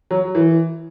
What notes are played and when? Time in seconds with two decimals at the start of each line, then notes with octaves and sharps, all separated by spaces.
0.11 F#3
0.35 E3